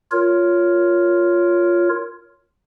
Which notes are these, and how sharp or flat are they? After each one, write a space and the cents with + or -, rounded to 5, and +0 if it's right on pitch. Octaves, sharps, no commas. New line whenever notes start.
F4 +0 A#4 +0 C#5 +10